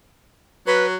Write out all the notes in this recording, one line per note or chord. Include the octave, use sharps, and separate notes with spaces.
F#3 B4